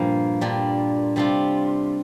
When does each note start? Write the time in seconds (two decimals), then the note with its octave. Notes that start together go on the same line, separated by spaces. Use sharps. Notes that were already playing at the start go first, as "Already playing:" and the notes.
Already playing: G2 A#2 F3 A#3
0.41 A#2 G3 D4
1.16 C3 G3 D4 F4